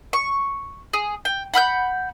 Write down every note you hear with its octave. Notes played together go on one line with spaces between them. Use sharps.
C#6
G#4
G5
F#5 B5 F6 G6